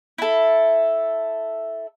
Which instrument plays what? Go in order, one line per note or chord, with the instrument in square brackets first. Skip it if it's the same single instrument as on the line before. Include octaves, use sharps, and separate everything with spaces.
[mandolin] E4 A4